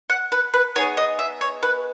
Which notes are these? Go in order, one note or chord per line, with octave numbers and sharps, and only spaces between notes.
F#5
B4
B4
B3 D#4 G#4 C#5
D#5
E5
C#5
B4